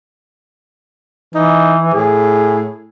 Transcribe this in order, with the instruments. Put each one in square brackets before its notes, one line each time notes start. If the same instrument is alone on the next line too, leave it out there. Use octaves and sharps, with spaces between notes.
[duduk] E3 [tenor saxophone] D#4
[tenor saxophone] A2 [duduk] G#4